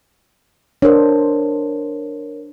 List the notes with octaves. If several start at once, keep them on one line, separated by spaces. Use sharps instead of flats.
D4 A#4 C5 C#5